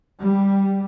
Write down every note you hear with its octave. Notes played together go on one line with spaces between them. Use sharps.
G3